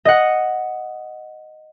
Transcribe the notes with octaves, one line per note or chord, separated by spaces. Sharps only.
D#5 F#5